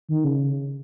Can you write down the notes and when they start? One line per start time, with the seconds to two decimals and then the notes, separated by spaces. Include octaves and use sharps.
0.09 D#3
0.24 C#3